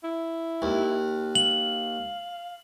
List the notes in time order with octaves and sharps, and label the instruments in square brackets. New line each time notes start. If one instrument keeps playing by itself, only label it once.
[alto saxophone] E4
[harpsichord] D#2
[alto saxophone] F5 [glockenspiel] F#7